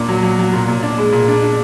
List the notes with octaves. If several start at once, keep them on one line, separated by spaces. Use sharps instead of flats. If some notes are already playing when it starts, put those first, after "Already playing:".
Already playing: A#2 D4
F#3
F#3
F#3
A#2
A#2
D4
G#3
A#2
D4
D4